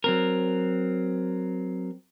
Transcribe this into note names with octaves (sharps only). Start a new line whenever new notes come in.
F#3 C4 A#4